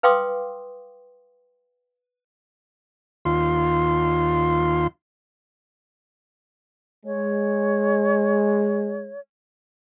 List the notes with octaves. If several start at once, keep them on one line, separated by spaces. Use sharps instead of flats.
B4 F5 G5 C6 D6 D#6
D#2 F4 C6
G#3 C#5